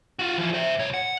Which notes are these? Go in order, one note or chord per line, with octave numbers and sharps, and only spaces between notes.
F4 F#4
E3 F3
C5 E5
C2 C#5
F#5